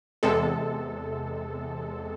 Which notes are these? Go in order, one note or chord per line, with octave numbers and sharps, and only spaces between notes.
E2 C3 G#3 A4